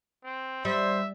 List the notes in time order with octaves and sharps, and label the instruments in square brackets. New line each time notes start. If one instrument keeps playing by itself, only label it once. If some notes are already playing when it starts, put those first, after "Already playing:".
[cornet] C4
[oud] G3 [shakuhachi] C5 [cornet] E5